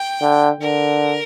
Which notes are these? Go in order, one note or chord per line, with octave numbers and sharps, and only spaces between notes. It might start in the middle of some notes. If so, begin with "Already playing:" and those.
Already playing: G5
D3
D3 A#4